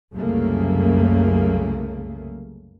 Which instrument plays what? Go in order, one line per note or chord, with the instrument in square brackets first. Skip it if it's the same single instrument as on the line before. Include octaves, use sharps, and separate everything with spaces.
[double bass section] C2 F#2 C#3 A3 A#3